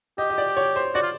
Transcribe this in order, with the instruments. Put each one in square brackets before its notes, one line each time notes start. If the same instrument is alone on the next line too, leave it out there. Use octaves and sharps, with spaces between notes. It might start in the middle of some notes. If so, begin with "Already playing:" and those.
[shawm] G4 [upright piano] D#5
[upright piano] D#5
D5
C#5
C5
[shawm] F#4 [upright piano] D5
[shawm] F4